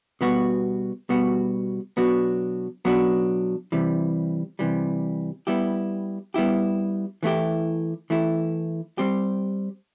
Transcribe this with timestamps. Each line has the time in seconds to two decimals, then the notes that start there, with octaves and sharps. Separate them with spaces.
0.21 B2 G3 B3 F#4
1.09 B2 G3 B3 F#4
1.97 B2 F#3 B3 D4 F#4
2.85 B2 F#3 B3 D4 F#4
3.72 C3 E3 G3
4.59 C3 E3 G3
5.47 G3 B3 E4 G4
6.34 G3 B3 E4 G4
7.23 E3 A3 E4 G4
8.10 E3 A3 E4 G4
8.98 G3 C4 G4